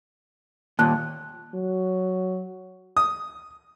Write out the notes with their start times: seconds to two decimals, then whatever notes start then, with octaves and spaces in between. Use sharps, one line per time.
0.79 D#2 A#2 A5 F#6
1.55 F#3
2.97 D#6